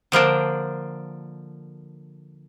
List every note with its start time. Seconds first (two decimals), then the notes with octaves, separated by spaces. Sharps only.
0.12 D3 F3 A#3 D4